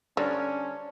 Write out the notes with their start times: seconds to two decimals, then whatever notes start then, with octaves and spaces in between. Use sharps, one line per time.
0.17 D3 G3 C#4 D4 A#4 C5